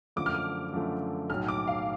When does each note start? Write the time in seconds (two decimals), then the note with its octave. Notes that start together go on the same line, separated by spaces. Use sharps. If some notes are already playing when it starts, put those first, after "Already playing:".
0.16 F#2 D3 F3 A3 D6
0.26 F6
0.35 D6
0.73 F#2 D3 F3 A3
1.30 B1 A2 F#3 F6
1.48 D6
1.67 F5